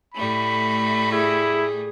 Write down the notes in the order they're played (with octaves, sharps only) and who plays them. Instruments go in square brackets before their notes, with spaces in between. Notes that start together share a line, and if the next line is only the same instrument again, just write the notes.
[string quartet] A2 G3 A3 [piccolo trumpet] B5
[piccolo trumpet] E4 [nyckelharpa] G#4